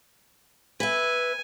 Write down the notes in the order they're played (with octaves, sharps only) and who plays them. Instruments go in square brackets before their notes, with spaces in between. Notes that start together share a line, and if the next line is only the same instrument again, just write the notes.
[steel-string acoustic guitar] B4 E5 [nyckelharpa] G#5